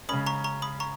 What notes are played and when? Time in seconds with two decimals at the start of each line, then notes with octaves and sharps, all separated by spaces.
0.09 C#3 G#3 C#4 B5 D#6
0.26 A#5 C#6
0.44 A#5 C#6
0.62 B5 D#6
0.80 A#5 C#6